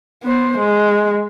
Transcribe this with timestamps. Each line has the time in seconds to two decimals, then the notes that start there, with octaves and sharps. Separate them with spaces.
0.23 B3 C5
0.58 G#3